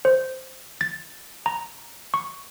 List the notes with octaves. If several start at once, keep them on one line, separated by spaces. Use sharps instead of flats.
C5
A6
A#5
C#6